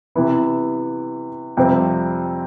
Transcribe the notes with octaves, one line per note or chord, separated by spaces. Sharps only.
C3 E3 B3 E4
F2 C3 G3 C4